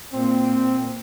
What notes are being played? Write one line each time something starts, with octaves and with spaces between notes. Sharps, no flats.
A#2 C4